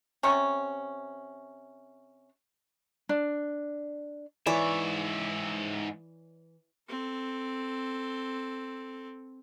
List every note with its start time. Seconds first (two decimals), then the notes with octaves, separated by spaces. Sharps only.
0.23 C3 C#4 C#6
3.09 D4
4.46 G#2 E3 C#5 D5 E5
6.89 C4 A4